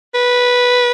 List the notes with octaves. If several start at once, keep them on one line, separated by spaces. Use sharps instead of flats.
B4